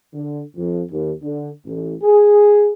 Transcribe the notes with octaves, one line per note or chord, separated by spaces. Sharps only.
D3
F2
D#2
D3
A1
G#4